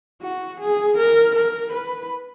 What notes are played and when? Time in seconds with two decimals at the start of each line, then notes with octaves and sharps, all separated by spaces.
0.22 F#4
0.60 G#4
0.98 A#4
1.35 A#4
1.73 B4